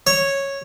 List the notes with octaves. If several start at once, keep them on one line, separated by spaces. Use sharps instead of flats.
C#5